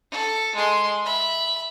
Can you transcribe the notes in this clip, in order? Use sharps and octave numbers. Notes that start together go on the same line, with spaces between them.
A4
G#3 C6
E5 B5